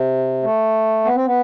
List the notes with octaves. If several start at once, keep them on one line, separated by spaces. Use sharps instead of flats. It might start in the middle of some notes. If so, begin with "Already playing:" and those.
Already playing: C3
A3
B3
C4
B3